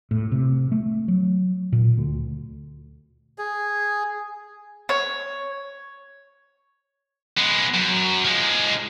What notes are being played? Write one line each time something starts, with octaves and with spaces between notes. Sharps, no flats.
A2
C3
A3
F#3
A#2
D2
G#4
C#5
G#3 B3
F#2
F3 G#3